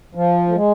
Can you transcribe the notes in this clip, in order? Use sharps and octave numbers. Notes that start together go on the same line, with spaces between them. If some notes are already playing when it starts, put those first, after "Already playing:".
F3
A3
G#3